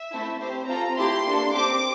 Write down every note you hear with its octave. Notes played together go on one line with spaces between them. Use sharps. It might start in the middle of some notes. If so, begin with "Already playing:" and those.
Already playing: E5
A3 C4 E4 A4
C4 G4 C5
C4 F4 A4 A#5
A3 E4 G4 C6
A#3 D4 A4
C4 G4 D6